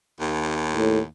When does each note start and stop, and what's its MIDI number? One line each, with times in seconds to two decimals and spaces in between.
0.20 1.05 39
0.72 0.99 45